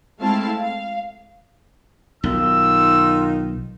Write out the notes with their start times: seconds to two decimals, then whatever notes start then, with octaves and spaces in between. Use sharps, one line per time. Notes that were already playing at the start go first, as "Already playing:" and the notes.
0.19 G#3 A3 C4 E4 F5 A5
0.57 F5
2.24 B1 D#3 F4 E6